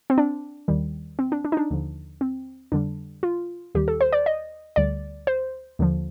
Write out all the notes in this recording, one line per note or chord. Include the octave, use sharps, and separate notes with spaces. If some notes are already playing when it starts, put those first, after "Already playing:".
C4
D4
D#2 D#3 G3
C4
D4
D4
D#4
D4
D#2 D3 F3
C4
F2 D3 G3 D4
F4
D#2 D#3 G3 G4
A4
C5
D5
D#5
D2 D3 G3 D5
C5
D#2 D3 F3